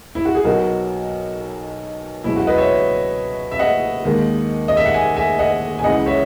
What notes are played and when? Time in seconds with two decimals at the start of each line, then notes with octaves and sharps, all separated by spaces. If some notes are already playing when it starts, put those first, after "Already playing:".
0.15 E4
0.25 F#4
0.35 G#4
0.45 B1 B2 F#3 F#4 A#4
2.24 C#2 B2 F#3 E4
2.36 F#4
2.47 B4 D#5
2.58 C#5 E5
3.52 E5
3.59 D#5 F#5
4.05 D#2 D#3 G#3
4.68 D#5
4.77 E5
4.86 F#5
4.94 E5 G#5
5.17 E5 G#5
5.39 D#5 F#5
5.79 G#5
5.84 C#2 C#3 E3 G#3 D#5 F#5
6.06 C#5 E5